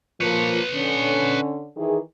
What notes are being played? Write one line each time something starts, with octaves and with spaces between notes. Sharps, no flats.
F3 A#3 F4 B4 C#5
D3 C#4
D#3 E3 G#4